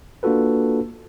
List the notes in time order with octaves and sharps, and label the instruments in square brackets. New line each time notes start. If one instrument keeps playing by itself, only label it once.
[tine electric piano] A#3 D4 F4 F#4 A4 B4